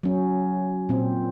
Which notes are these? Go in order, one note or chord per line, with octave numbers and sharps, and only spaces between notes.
F#3 C#4
A#2 C4